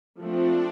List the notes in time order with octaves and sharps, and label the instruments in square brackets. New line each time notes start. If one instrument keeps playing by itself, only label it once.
[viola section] F3 A3 C4 [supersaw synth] D4